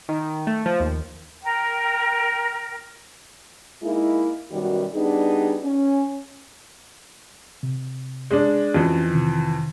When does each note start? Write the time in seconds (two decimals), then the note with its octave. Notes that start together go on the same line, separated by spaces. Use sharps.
0.09 D#3
0.47 A3
0.66 F3
0.80 D#2
1.43 A#4 G5
3.83 G#3 A#3 D#4 E4
4.52 F#2 B2 D#3 G3 F#4
4.95 G3 B3 D4 D#4 G#4
5.64 C#4
7.63 C3
8.31 G#3 D4
8.74 F2 E3 C#4 F#4 D#5
9.11 C3 D#3